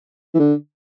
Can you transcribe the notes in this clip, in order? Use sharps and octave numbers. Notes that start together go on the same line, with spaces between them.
E3
D3